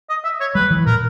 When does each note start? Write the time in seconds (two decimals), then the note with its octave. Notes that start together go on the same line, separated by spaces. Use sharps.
0.10 D#5
0.24 E5
0.40 C#5
0.55 G3 B4
0.70 E3
0.86 A#2 A#4